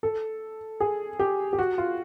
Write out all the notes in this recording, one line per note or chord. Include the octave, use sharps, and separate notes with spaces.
A4
G#4
G4
G4
F#4
F4